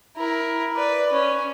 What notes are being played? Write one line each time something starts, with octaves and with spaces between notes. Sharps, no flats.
E4 A#4
B4 D5
C#4